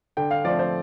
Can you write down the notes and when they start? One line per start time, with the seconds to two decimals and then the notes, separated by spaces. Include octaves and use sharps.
0.17 D3 G5
0.31 F5
0.45 F3 A3 C4 D5
0.59 C5